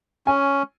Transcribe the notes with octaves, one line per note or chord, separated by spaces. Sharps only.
C#4 G#5